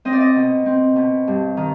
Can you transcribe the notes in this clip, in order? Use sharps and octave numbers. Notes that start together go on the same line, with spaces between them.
C4 D#5
D5
D#5
B2
C4
B2
G2
D#3